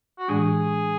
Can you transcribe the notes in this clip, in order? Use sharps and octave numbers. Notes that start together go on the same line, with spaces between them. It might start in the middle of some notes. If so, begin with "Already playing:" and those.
F#4
A2 E3 G#3 D4 G#4